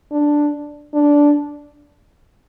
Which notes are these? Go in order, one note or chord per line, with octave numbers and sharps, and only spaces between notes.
D4
D4